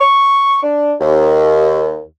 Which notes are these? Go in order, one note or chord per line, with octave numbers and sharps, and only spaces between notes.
C#6
D4
D#2